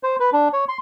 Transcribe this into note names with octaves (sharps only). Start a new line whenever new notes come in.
C5
B4
D4
C#5
C6